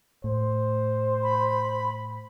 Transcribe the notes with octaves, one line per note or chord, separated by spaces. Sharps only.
A2 C5
B5